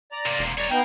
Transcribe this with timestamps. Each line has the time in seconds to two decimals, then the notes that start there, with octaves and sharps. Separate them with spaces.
0.12 D5 A#5
0.26 C3 A#3
0.39 E1
0.58 B1 C#5 D5 A#5
0.71 A#3 B3 D#4 A#4 G5